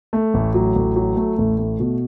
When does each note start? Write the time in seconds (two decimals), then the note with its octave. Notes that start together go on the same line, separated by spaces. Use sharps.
0.13 A3
0.34 A1
0.54 F#3
0.76 A1
0.96 F#3
1.16 A3
1.38 A1
1.58 A3
1.80 B2